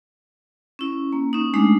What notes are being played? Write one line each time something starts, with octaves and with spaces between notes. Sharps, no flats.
C#4 E4
A#3
C#4 D#4
G#3 A3 D4 D#4